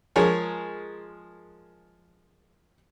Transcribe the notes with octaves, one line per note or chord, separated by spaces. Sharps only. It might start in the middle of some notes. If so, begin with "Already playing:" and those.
F3 G#3 G#4 A#4 C#5